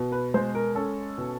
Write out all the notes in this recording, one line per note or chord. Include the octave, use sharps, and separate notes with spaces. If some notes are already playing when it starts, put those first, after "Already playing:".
Already playing: B2
B4
G#3 C5
A#4
C#4 A4
B2